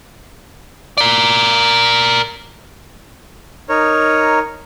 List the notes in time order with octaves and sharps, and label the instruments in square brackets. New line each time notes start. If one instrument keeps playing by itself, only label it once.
[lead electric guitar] A#4 D5
[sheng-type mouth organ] D#4 A#4 C#5